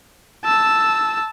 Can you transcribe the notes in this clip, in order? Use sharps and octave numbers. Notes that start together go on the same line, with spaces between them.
A5 E6